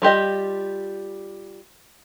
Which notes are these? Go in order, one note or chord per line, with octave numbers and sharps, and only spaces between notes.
G3 F4 G4 D#5